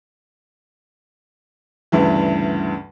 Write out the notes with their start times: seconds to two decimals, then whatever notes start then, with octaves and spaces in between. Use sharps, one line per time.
1.92 D2 G2 C#3 E3